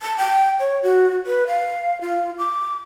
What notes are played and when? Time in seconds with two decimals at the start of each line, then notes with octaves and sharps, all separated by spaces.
0.02 A5
0.17 G5
0.60 C#5
0.83 F#4
1.27 B4
1.47 F5
2.01 F4
2.38 D6